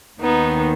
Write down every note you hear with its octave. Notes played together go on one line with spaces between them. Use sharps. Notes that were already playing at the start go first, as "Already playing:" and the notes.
D#2 D#3 B3 D#4